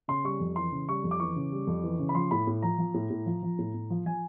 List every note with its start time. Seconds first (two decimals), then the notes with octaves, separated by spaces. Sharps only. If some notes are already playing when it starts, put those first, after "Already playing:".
0.08 C#3 C6
0.24 G3 C#6
0.40 F2
0.56 E3 C6
0.72 C#3
0.89 G3 C#6
1.04 F2
1.11 D6
1.20 E3 C#6
1.36 C#3
1.52 G3
1.67 F2
1.83 E3
1.99 C#3
2.09 B5
2.15 F3 C6
2.31 A2 B5
2.47 A2
2.62 F3 A#5
2.78 F3
2.94 A2
3.10 A2
3.26 F3
3.43 F3
3.59 A2
3.74 A2
3.90 F3
4.06 F3 G#5